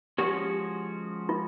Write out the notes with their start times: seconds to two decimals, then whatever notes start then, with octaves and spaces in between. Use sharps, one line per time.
0.18 F3 G#3 C#4 F#4 G4
1.29 F4